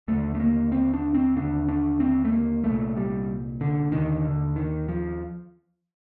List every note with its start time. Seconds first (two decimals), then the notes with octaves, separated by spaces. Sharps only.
0.08 D#2 D3 A3
0.35 A3
0.40 A#3
0.72 C4
0.94 D4
1.14 C4
1.36 D#2 D3 D4
1.69 D4
2.00 C4
2.25 A3
2.32 A#3
2.64 C2 A#2 A3
2.97 G3
3.61 D3
3.92 D#2 D3 D#3
4.25 D3
4.56 D#3
4.88 F3